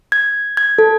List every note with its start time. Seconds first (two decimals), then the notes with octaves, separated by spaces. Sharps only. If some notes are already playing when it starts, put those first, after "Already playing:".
0.12 G#6
0.57 G#6
0.78 A4